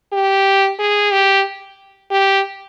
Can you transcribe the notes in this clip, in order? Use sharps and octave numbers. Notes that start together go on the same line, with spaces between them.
G4
G#4
G4
G4